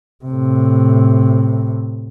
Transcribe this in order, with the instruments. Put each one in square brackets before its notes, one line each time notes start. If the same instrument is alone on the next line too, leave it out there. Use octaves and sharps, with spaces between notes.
[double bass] A2 C3